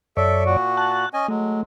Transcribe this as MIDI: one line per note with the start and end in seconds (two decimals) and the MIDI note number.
0.17 0.57 42
0.17 0.44 69
0.17 0.57 73
0.17 0.57 74
0.17 0.44 76
0.46 1.05 46
0.46 1.05 66
0.77 1.09 81
0.77 1.09 90
1.14 1.27 61
1.14 1.27 75
1.14 1.27 80
1.28 1.61 54
1.28 1.61 56
1.28 1.63 57